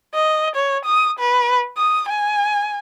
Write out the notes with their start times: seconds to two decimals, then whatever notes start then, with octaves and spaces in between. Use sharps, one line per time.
0.14 D#5
0.55 C#5
0.85 D#6
1.19 B4
1.77 D#6
2.09 G#5